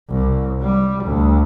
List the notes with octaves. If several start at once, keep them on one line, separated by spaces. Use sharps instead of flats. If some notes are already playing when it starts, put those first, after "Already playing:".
C2
G3
D2